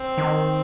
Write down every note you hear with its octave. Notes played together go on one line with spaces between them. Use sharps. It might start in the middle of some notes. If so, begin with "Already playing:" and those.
Already playing: C4
D#3